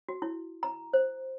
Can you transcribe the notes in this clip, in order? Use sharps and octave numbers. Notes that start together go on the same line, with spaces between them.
F#4
E4
A#5
C5